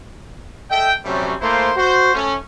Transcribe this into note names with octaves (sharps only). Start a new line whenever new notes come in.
A4 D#5 E5 G5
C3 F#3 G3 A3 C4 C#4
A3 A#3 E4 C5
F#4 C5
A3 C#4